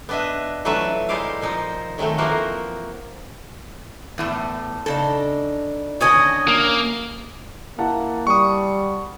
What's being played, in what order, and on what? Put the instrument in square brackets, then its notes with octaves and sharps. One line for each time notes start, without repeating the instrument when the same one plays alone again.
[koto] B3 D4 B4 D#5 E5
E3 F#3 A3 F4 B4 E5
G#3 D#4 E4 C5 D5 F5
A#2 F3 D#4 C5
D#3 F#3 G#3 A3 C4
E3 F3 A#3 F#4 A#4 C5
[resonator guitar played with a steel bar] E2 A2 A3
[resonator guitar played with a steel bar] C#3 A4 [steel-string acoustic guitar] D4 D#4
[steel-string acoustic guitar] D#2 D3 C#4 [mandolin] F#4 D#5 G#5
[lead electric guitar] A#3
[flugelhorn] A#3 [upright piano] E4 F#5 A5
[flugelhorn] G3 [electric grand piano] C#6 D#6